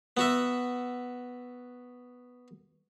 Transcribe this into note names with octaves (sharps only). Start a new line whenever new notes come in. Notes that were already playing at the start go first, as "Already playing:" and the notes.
B3 F#4 E5